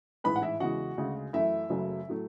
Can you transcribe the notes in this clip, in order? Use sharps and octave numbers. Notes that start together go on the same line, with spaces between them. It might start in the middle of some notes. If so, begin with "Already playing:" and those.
A1 G#2 E3 G#3 B4 B5
F#5
E4 E5
E2 C#3 E3 G#3 F#4 F#5
D2 C#3 G#3
F#2 E3 A3 E4 E5
F#1 F#2 C#3 F#3 A3
A2 F#3 A3